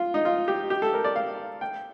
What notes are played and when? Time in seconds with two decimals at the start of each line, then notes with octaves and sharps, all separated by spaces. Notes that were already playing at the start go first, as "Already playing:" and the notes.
Already playing: F4
0.14 D#4
0.25 F4
0.48 G4
0.70 G4
0.82 A4
0.94 A#4
1.04 D5
1.16 F5
1.61 G5